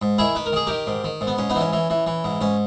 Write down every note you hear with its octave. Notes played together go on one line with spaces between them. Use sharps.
G#2
D#3 E4 G#4
D#3 B4
A#4
D#3 G#4
D#3 G4 A#4
G#2
D#3
G#2
B3
G#2 C#4
B3 D#4
E3
C#4
E3
E3
E3
G#2
G#2 C#4